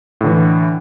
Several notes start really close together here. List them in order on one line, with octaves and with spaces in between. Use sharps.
A2 D3 E3